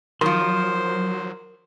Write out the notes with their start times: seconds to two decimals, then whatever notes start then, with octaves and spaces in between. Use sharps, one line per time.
0.21 D#3 F3 F#3 A#4 C5 C6